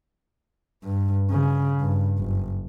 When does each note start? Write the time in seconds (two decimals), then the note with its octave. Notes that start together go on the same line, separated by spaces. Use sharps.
0.84 G2
1.31 C#3
1.81 G2
2.18 F#1